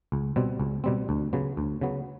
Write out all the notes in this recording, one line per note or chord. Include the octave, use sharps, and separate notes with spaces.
C#2
B2 G3 C4
C#2
B2 G3 C4
D2
C#3 F#3 B3
D2
C#3 F#3 B3